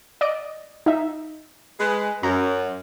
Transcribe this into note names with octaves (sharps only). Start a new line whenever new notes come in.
D5 D#5 D7
D#4 E5
G#3 B4
F#2 A#5